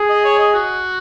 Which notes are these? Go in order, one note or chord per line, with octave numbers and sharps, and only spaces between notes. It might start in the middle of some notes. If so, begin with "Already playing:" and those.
Already playing: G#4
D#5
C#5
D#5
F#4